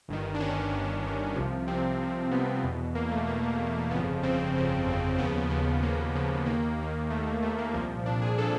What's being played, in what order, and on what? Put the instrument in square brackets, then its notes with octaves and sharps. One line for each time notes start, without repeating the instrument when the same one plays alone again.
[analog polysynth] G1 G2 D#3
D4
G1 G2 D#3 C#4
G1 G2 D#3
G1 G2 D#3
C2 C3 F3
C2 C3 F3 C4
C2 C3 F3
C2 C3 F3 B3
E2 B2
E2 B2 A#3
A3
E2 A#3
B2
A#3
E2 B2
G1 F2 C#3 F3 B3
G1 F2 C#3 F3 C4
G1 F2 C#3 F3
G1 F2 C#3 F3
D#2 C#3 F3 B3
D#2 C#3 F3
D#2 C#3 F3 A#3
D#2 C#3 F3
D#2 D#3 A#3
D#2 D#3
D#2 D#3 A3
A#3
D#2 D#3 A3
A#3
C2 A#2 F3 A#3
C2 A#2 F3 D4
G#4
A#2 F3 A4